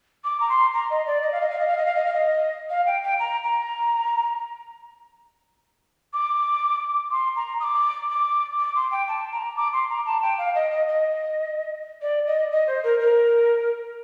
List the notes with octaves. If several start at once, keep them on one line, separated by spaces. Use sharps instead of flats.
D6
A#5
C6
A#5
D#5
D5
D#5
F5
D#5
F5
D#5
F5
D#5
F5
D#5
F5
D#5
F5
G5
G5
A#5
A#5
D6
C6
A#5
D#6
D6
D6
D6
C6
G5
A5
A#5
D6
C6
A#5
A5
G5
F5
D#5
D#5
D#5
D5
D#5
D#5
C5
A#4
A#4